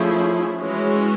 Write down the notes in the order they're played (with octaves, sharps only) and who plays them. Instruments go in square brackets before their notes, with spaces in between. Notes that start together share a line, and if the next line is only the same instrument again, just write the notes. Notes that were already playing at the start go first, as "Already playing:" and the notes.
Already playing: [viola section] F3 A3 C#4 E4 G#4
E3 G#3 C#4 F#4